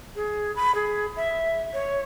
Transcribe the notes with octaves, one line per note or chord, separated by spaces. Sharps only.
G#4
B5
G#4
E5
C#5